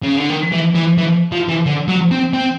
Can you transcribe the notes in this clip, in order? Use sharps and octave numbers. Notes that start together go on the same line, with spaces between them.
C#3
D3
D#3
E3
E3
E3
F3
E3
D3
F#3
C4
C4